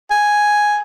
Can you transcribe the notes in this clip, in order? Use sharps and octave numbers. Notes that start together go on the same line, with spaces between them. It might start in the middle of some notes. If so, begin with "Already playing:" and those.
G#5